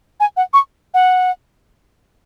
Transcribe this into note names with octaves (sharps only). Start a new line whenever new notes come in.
G#5
F#5
C#6
F#5